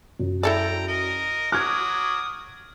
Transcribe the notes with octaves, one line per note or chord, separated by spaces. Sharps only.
F#2
E4 A4 D5 G5 A#5
A#4 D#5
F#3 D6 D#6 F6 G#6